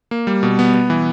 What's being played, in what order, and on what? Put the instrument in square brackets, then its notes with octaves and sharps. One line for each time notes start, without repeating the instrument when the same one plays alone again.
[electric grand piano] A#3
G3
B2
B3
B3
E3